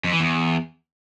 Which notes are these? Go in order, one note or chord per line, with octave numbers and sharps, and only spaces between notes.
F2
E3
E2